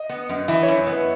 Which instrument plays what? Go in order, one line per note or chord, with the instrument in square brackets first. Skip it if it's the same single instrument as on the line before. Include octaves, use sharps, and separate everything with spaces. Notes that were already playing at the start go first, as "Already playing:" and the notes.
Already playing: [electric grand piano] D#5
[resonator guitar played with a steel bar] B3
F#2
[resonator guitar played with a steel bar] E3 [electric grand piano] E5
[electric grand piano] C#5
[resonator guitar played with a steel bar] F#2
[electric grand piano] C#5
[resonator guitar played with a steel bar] B3
[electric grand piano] B4